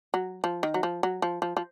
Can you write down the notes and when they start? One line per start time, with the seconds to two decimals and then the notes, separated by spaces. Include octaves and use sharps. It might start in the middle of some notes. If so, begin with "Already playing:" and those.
0.14 F#3
0.44 F3
0.63 D#3
0.74 F#3
0.83 F3
1.03 F#3
1.22 F3
1.42 F3
1.57 F3